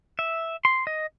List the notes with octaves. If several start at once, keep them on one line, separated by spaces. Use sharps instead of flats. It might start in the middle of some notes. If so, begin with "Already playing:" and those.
E5
C6
D#5